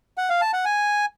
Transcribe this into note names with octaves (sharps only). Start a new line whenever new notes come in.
F#5
F5
A5
F#5
G#5